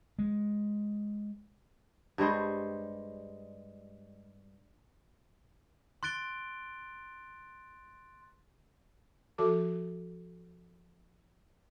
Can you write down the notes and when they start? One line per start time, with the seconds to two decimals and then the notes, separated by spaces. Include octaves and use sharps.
0.19 G#3
2.18 G2 G3 G#3 C5
6.03 C6 F#6 A6 D7 G7
9.38 F3 F#4 A4 A5 D6